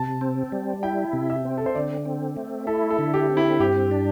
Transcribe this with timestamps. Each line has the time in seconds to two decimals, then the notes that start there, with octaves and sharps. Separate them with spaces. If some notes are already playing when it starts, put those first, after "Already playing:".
Already playing: C3 A5
0.21 C4
0.52 G3
0.83 E4 G5
1.13 C3
1.30 E5
1.45 C4
1.58 A4
1.66 C5
1.75 D3 D5
2.05 C4
2.37 A3
2.67 E4 A4
2.91 A4
2.99 D3
3.14 G4
3.29 C4
3.37 E4
3.59 G2 G4
3.91 D4